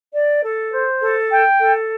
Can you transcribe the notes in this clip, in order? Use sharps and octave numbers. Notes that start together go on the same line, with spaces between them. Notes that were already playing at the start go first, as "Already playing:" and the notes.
D5
A4
C5
A4
G5
A4